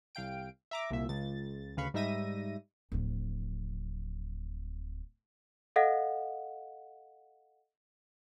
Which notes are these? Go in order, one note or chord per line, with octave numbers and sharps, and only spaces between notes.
C2 F5 G5 D7
E5 A#5 D6
C2 A#2 E5
C#2 A6
D2 C#3 B4 F5 B5 C#6
G#2 G3 D#4 E5 A#6 D#7
D1 F3
A4 D#5 F5 F#5